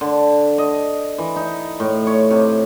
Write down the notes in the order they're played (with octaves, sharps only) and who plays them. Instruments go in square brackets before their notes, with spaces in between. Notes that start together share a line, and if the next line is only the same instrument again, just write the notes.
[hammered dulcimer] D3
D#5
E3
D#4
A2
C#5
C3